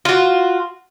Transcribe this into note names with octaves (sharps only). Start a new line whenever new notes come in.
F4 F#4